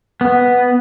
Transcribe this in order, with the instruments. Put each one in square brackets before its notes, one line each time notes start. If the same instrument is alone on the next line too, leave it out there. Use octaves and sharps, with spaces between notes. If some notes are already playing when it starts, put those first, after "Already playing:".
[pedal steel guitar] B3